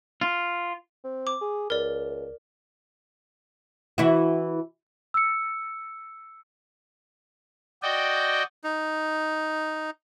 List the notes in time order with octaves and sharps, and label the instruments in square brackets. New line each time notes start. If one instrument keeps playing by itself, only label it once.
[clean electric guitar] F4
[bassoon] C4
[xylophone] D6
[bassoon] G#4
[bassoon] C#2 [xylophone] A#4 D5
[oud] E3 E4 F#4
[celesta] E6 C#7
[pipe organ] F#4 D5 D#5 G5
[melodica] D#4